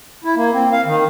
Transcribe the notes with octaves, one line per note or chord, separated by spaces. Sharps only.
E4
A#3
C4
F5
D#3